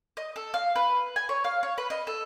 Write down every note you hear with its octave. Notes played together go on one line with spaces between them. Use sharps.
D#5
A4
F5
B4
G#5
C#5
F5
C#5
B4
D#5
A4